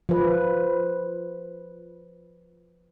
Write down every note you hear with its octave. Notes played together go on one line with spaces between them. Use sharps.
F3 B4